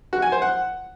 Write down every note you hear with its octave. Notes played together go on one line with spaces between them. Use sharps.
F#4
G#5
C5
F#5